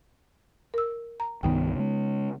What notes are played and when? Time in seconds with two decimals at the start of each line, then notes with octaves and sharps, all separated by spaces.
0.74 A#4 E6
1.20 A#5
1.43 C2 G2 D#3 B3 D#4 G5
1.75 C#3 G#3